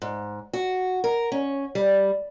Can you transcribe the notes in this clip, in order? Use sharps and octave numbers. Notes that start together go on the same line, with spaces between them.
G#2
F#4
A#4
C#4
G3